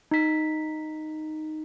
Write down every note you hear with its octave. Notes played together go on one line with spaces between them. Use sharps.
D#4 B6